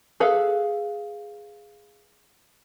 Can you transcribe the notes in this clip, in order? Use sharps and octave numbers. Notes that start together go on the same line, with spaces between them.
G#4 A4 B4 F5